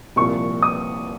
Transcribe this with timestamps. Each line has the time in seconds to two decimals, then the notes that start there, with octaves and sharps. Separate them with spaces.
0.16 C2 A#2 F3 C#6
0.62 D#6